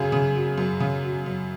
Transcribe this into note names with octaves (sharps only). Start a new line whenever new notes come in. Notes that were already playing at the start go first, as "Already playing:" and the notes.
Already playing: F#2 C#3 G#4
C#3
F#3
F#2
C#3
F#3
F#2